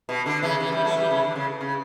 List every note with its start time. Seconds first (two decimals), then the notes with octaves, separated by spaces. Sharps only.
0.09 B2
0.26 D3
0.43 C#3 E3
0.60 C#3 E3
0.72 E3 G3
0.84 F#3 A3
0.97 E3 G3
1.11 C#3 E3
1.23 D3
1.36 C#3
1.61 C#3